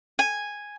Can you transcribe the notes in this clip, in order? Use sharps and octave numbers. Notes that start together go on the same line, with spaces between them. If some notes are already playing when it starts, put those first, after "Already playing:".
G#5